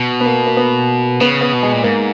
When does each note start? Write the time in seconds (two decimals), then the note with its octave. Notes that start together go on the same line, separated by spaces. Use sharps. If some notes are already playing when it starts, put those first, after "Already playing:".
Already playing: B2
0.21 B3
0.25 A#3
0.47 A#3
0.57 B3
1.20 C#3 B3
1.41 B3
1.53 B2
1.63 G#3
1.72 A#2
1.84 G#2 A#3